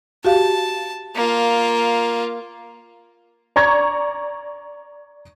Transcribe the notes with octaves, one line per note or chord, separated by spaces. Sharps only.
F#4 G4 F5 A5
A#3 F4
D5 A#5 C#6 G#6